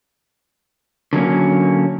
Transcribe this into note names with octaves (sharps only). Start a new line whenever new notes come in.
D3 F#3 A#3 C#4